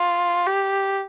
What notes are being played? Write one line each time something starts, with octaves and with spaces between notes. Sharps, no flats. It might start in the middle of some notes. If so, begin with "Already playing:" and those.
Already playing: F4
G4